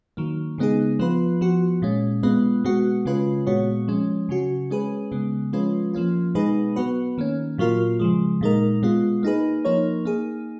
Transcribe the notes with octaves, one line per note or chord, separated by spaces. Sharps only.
D#3 F#3 A#3
C#3 G#3 B3 D#4 G#4
F3 B3 F4 B4
F3 B3 F#4
A#2 G#3 C#4
B2 G#3 B3 F4 B4
B2 G#3 B3 F#4
C#3 G#3 C#4 F4 B4
A#2 G#3 B3 F#4 C#5
F3 G#3 C#4
C#3 F#3 C#4 F#4
G#3 C#4 G#4 B4
C#3 G#3 B3
F3 G#3 C#4 F4 B4
F3 A#3 C#4 F4
B2 G#3 D#4 G#4 B4
F#3 B3 F#4 B4
D#3 A#3 C#4
A#2 F#3 A#3 F4 A#4
C#3 F3 G#3
A#2 G#3 D#4 A#4
B2 G#3 B3 F4
A#3 D#4 G#4 B4
F3 A#3 D#4 A#4 C#5
A#3 D#4 G#4